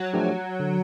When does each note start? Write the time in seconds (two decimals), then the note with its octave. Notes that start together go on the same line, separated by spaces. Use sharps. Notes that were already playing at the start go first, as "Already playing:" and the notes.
Already playing: F#3
0.13 F3 A3 D4 G4
0.60 D3